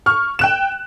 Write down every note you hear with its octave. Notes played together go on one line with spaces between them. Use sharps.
C#6 F6
G5 F#6 E7